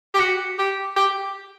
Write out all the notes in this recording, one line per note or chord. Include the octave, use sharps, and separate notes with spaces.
G4
F#4
G4
G4